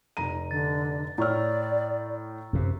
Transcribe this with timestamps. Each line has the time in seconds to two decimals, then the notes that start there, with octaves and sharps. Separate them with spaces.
0.17 F1 A#5 D#7
0.51 D3 A6
1.18 A2 C#5 D5 A#5 C#6 E6 F6
2.53 F#2 C3